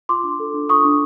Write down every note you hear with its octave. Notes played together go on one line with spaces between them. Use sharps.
F4 C6 D6
D4
A4
D4
F4 C#6 D#6
D4